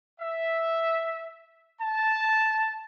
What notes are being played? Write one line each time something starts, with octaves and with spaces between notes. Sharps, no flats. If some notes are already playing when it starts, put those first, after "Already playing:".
E5
A5